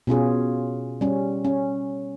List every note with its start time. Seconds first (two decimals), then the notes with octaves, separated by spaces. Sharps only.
0.07 B2 C#4 F4 G#4
1.01 G3 C#4
1.45 C#4